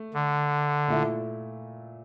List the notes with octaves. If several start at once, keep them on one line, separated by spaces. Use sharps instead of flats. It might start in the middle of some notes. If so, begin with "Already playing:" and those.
Already playing: A3
D3
A#2 A3 E4